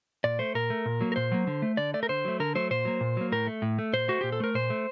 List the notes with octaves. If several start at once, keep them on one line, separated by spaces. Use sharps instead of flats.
A#2 D5
A3 C5
A#2 A#4
A3
A#2
F#3 A#3
A#4
A#2 C5
F#3 A#3
D3
A3
D3 D5
A3 D5
A#4
D3 C5
F#3 A3
D3 A#4
F#3 A3 C5
A#2 C5
F#3 A#3
A#2
F#3 A#3
A2 A#4
A3
A2
A3
A#2 C5
A3 F#4
A#2 G4
A4
A3 A#4
A#2 C5
A3